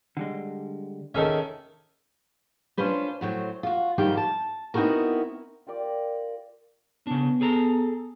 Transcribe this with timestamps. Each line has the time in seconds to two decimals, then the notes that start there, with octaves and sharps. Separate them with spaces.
0.17 D3 G3 G#3
1.15 D#3 C#4 G#4 A4 E5
2.77 C#4 D4 F4 B4 C5
3.21 A2 F#3 C4
3.63 F4 F#4
3.98 G#2 D#3 F3 G3 C4 G4
4.17 A5
4.74 B3 C4 D#4 E4 F#4 A#4
5.67 F4 G4 A#4 D5
7.07 C#3 B3 D4
7.41 G#4 A4 A#5